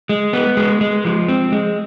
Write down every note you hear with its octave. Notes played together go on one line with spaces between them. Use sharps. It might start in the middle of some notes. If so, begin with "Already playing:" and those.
G#3
B3
G#3
G#3
F3
C4
G#3